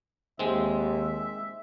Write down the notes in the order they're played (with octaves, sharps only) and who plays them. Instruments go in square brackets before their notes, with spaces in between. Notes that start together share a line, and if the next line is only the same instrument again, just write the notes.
[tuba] D#2 [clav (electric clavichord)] G#3 C4 [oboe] E5